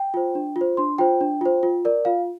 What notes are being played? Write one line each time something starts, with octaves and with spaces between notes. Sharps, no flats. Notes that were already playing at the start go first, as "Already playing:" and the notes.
Already playing: G5
F4 C5
D4
F4
C5
D4 C6
F4 C5 G5
D4
F4 C5
F4
A#4 D5
F4 F5